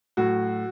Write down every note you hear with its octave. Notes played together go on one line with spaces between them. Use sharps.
A2 F#3 F#4